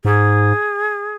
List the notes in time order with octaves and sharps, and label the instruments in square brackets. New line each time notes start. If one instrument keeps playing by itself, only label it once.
[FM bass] G#2 [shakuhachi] G#4